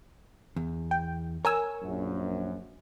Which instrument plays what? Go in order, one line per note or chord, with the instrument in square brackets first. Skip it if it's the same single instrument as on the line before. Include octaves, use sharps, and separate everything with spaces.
[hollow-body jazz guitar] E2
[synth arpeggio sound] G5
[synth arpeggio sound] A#4 G#5 E6 [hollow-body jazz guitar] C#5
[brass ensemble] A#1 F#2